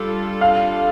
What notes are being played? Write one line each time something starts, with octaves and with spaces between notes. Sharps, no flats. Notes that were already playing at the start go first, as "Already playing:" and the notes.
Already playing: G3 D4 F4 A4
F5